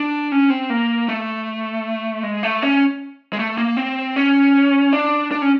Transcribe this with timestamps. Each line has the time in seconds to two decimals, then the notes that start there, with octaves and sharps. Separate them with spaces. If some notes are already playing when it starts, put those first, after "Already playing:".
Already playing: D4
0.32 C#4
0.50 C4
0.70 A#3
1.08 A3
2.23 G#3
2.43 A3
2.62 C#4
3.33 G#3
3.39 A3
3.58 A#3
3.77 C4
4.16 C#4
4.93 D4
5.31 D4
5.42 C#4